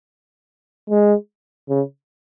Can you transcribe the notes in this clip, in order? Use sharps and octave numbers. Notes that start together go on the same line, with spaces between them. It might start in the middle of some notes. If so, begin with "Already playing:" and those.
G#3
C#3